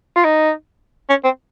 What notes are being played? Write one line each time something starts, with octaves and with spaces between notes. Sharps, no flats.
F4
D#4
C#4
C4